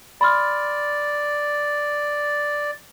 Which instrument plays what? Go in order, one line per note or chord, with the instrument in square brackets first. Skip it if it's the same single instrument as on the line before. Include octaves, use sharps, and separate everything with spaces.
[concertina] D5 [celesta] B5 C6 F6